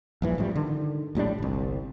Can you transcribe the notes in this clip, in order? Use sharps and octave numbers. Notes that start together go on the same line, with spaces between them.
A#1 G2 E3
A1 G#2 F3 G3
D3 D#3
A#1 A2 G3 D4
G1 C2